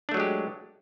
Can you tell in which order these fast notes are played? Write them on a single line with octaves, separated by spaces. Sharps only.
D4 A3 F#3 G#3 G4